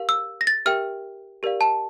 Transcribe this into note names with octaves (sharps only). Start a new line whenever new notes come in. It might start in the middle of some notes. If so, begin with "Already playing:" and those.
Already playing: G4 A#4 F5
E6
A#6
A6
G4 A#4 E5 G5 F6
G4 A#4 D5 F5
A5